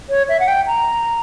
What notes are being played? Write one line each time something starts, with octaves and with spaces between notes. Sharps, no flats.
C#5
E5
F#5
G5
A#5